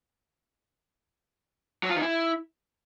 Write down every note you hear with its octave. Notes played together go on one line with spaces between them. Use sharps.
F#3
F4
D#3
E4